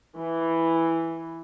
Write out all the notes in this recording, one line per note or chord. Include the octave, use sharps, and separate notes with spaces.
E3